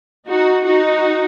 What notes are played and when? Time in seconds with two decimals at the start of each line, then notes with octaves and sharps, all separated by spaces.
0.27 D#4 F#4
0.65 D#4 F#4